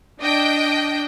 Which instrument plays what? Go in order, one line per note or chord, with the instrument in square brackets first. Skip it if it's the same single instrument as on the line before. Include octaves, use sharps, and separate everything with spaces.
[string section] D4 D#5 G5